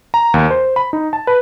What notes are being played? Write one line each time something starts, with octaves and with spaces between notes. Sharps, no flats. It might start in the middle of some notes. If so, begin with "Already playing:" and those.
A#5
D#2
C5
B5
D#4
A5
B4